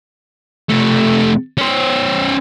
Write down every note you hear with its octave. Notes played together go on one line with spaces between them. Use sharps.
C3 A3
C#4 C5